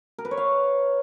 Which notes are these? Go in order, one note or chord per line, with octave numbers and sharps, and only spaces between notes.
A#4
B4
C#5
F5